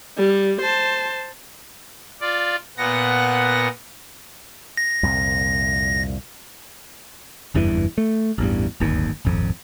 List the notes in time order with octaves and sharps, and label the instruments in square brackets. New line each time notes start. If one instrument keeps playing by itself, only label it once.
[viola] G3
C5 A5
[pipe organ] F4 D5
A#2 B3 F#5 A#6
[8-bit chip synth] A#6
[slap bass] C2 F2 A#2
[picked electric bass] F#1 E2 G2 E3
A3
A1 E2 G2
D1 G1 D#2
D#1 G#1 F2